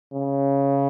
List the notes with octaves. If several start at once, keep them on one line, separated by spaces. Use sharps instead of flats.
C#3